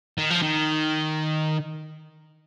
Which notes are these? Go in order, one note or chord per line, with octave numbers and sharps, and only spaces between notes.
D#3
F3
D#3